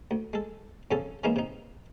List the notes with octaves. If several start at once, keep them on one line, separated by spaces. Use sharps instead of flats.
D2
G#3 A4
F2 C#3 C#4 A4
E3 G#3 A#3 C#4 D#4 E4
C3 D#4